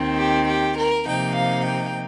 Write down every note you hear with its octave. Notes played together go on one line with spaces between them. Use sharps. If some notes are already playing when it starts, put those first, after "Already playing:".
Already playing: D#2 D#3 C4
G4
G4
A#4
C3 F3 A#3 D#4 G5
F5
G5